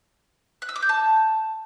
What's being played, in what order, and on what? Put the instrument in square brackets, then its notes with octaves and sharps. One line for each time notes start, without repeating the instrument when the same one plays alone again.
[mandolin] F#6
E6
D6
G6
A5